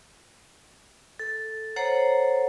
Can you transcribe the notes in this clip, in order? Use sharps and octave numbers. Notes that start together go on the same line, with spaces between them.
A4
A4 C5 C#5 F#5 A#5